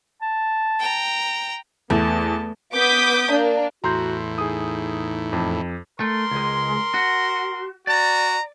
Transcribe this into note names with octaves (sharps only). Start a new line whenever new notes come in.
A5
G5 A#5
E2 A3 B3 A5
B3 D6 D#6 G6 B6
A#3 D4
E2 A2 F#4 A#5 C6 G6
D#4 G#4 D#6
F2
A3 A#4 C6
C#2 G#3
F#4
F#4 D5 A#5